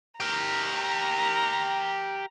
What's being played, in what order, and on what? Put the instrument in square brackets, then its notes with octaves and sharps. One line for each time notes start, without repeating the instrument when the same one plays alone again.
[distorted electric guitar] G4 A#4 [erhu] A#5